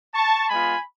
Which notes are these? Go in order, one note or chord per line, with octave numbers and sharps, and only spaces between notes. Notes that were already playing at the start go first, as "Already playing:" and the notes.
A5 C#6
G#3 B3 F4 G#5 B5